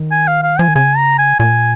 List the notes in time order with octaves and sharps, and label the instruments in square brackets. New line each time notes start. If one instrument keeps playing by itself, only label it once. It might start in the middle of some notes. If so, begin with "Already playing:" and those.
Already playing: [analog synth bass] D#3
[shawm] G#5
F5
F5
[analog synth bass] F3 [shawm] G#5
[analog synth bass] D#3
[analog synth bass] C#3 [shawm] G#5
[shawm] A#5
G#5
[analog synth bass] A#2 [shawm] G#5